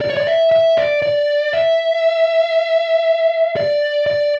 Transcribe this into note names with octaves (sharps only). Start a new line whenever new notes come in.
D5
C#5
D5
E5
E5
D5
D5
E5
D5
D5